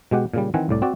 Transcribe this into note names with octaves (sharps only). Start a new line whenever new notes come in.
B2 G#3 G4 F#5
A#2 C#3 G3
D#3 E3 C4 F#5 G#5
C2 A2 D5
C4 F#4 D5